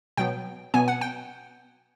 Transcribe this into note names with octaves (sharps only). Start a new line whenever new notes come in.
B2 F#3 B3 G5
B2 F#3 B3 G#5
F#5
G5